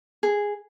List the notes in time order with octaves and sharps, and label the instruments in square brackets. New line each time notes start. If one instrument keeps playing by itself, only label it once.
[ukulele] G#4